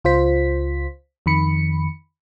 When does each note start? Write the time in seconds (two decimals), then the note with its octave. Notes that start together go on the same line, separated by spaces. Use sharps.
0.04 C#2 F4 C5 B6
1.26 F2 D#3 B5 C#7